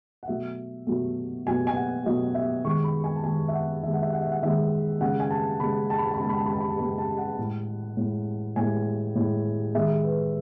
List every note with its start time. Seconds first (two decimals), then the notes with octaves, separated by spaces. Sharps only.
0.23 F#5
0.28 B2 F#3 A3 E5
0.87 B2 F#3 A3
1.46 B2 F#3 A3 G#5
1.67 G#5
1.76 F#5
2.06 B2 F#3 A3 D#5
2.35 E5
2.65 D#3 G#3 C#6
2.84 B5
3.04 G#5
3.16 A5
3.24 D#3 G#3 G#5
3.48 E5
3.54 F#5
3.83 D#3 G#3 E5
3.94 F#5
4.02 E5
4.13 F#5
4.22 E5
4.32 F#5
4.43 D#3 G#3 E5
5.01 C#3 G#3 F#5
5.20 G#5
5.31 A5
5.60 C#3 G#3 B5
5.90 A5
5.98 B5
6.06 A5
6.14 B5
6.20 C#3 G#3 A5
6.29 B5
6.38 A5
6.46 B5
6.53 A5
6.61 B5
6.69 A5
6.79 C#3 G#3 B5
6.98 A5
7.18 F#5
7.38 A2 G#3
7.97 A2 G#3
8.56 A2 G#3 G#5
9.15 A2 G#3
9.75 D#3 G#3 E5
10.04 B4